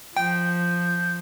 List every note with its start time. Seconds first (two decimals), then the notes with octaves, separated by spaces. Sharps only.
0.17 F3 G5 G6